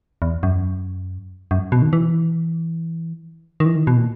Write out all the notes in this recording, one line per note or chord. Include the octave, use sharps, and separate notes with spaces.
E2
F#2
F#2
B2
D#3
E3
D#3
E3
D#3
B2
A#2